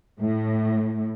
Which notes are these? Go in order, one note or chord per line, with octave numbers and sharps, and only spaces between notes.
A2